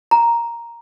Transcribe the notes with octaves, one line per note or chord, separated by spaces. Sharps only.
A#5